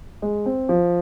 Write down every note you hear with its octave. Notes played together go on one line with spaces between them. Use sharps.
G#3
C4
F3